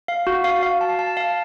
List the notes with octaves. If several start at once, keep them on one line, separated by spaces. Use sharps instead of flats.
F5
F#4
F5
F5
A5
A5
F5